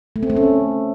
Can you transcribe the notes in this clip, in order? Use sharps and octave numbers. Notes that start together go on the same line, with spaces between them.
A3
C4
A3
C#4